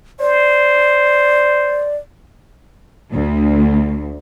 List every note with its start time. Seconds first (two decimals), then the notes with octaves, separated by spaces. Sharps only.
0.20 C5 D5
3.13 D2